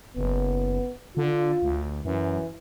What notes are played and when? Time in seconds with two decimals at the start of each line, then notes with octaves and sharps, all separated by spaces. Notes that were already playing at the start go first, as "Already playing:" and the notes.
0.16 F#1 B3
1.17 D3 F4
1.62 D2
2.05 F#2 E3